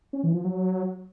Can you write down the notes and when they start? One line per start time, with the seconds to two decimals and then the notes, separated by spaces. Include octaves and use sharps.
0.13 C#4
0.23 E3
0.34 F3
0.44 F#3